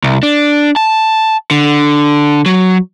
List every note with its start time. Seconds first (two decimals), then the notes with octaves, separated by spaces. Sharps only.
0.04 C2
0.23 D4
0.76 A5
1.51 D3
2.46 F#3